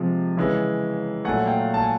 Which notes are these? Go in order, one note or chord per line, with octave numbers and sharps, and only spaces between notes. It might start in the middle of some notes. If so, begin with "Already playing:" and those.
Already playing: C3 F3 G#3
C#3 E3 G#3
A#2 F#3 A3 F#5 G#5
F5 G5
A5
G#5